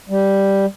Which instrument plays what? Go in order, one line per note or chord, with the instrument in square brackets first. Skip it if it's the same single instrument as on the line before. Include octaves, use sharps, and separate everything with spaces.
[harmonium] G3